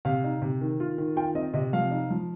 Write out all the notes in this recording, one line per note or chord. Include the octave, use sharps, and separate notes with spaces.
C3 F5
D#4
C3
D#3
F4
D#3
F4 G5
C4 D#5
C3 D#5
F3 F5
D#4
F3